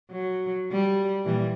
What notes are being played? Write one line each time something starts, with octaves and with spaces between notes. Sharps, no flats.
F#3
G3
A#2 E3 G3